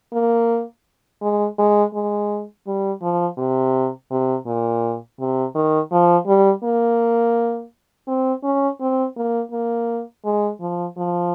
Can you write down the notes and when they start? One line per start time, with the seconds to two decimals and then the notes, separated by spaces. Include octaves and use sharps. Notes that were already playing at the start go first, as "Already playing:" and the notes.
0.13 A#3
1.22 G#3
1.58 G#3
1.94 G#3
2.67 G3
3.02 F3
3.38 C3
4.11 C3
4.46 A#2
5.20 C3
5.55 D#3
5.92 F3
6.27 G3
6.64 A#3
8.08 C4
8.44 C#4
8.81 C4
9.17 A#3
9.52 A#3
10.25 G#3
10.60 F3
10.97 F3